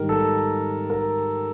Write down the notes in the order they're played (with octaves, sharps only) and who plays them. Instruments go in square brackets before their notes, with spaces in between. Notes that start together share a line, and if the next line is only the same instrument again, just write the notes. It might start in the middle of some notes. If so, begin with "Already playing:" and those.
Already playing: [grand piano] G#2 D#3 G3 A#4
A4
A#4